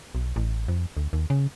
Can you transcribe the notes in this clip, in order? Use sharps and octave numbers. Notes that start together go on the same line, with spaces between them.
B1
A1
F2
D2
D#2
C#3